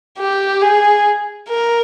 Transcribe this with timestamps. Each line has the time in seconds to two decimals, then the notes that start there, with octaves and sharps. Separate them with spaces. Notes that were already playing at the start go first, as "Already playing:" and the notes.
0.18 G4
0.62 G#4
1.49 A#4